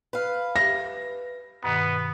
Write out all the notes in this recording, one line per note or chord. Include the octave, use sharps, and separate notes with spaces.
B4 F5
G4 E5 A#6
G2 B2 D#3 B3